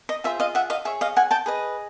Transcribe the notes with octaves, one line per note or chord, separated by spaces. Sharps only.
D#5
F4 G#4 C5 E5
D#5 F5
E5 F#5
D#5 F5
G#4 C#5 E5
D#5 F5
F#5 G#5
G5 A5
G#4 B4 D#5